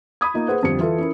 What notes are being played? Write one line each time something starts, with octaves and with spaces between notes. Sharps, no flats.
B5 D#6 G#6
A#3 D#4 F4
A#3 G#4 B4 C5 F#5
F2 D3 F3 G3 C#7
E3 F4 A4
C#4 E4 A#4